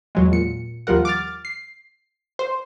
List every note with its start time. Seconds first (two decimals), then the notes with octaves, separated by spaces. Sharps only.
0.15 E2 F#3 G#3
0.32 A#2 C#7
0.87 D#2 F3 G3 A#4 F#5
1.05 D6 F6 A6
1.45 C7
2.39 C5